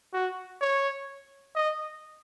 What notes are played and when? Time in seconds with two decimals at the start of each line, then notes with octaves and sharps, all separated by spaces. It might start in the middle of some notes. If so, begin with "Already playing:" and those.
0.14 F#4
0.61 C#5
1.55 D#5